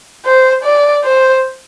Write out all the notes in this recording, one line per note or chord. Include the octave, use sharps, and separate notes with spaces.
C5
D5
C5